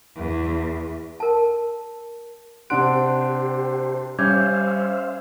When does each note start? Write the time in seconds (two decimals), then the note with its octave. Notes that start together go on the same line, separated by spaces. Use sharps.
0.16 E2
1.20 A#4 A5
2.70 C3 D4 G4 C5 F#5 C6 F#6 D7
4.19 G3 C#4 C5 E5 F5 D6 G6 G#6